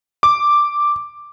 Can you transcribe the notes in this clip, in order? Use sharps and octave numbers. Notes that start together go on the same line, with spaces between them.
D6